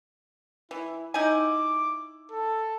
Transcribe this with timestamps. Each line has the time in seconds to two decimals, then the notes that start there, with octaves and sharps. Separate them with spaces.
0.71 E3 E4
1.14 D#4 E4 G#5 D6
2.32 A4